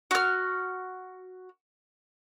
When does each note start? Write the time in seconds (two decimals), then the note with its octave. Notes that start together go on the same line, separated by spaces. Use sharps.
0.11 F#4 F6